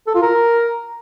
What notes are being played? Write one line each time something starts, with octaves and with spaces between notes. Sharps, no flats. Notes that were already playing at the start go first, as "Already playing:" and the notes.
A4
F4
A#4